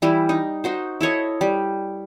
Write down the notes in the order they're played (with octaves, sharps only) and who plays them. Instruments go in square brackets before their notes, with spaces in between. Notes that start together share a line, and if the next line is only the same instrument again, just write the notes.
[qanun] E3 G3 E4
D#4
D#4 F#4 C5
E4 A4 C#5 D#5
G3